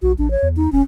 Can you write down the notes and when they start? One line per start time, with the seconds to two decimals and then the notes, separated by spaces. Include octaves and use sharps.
0.02 B1 F#4
0.18 A1 D4
0.31 C#5
0.42 E2
0.57 D#4
0.72 E1 C#4